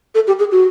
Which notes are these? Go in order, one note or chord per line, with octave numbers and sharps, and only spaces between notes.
A4
G4
G#4
F#4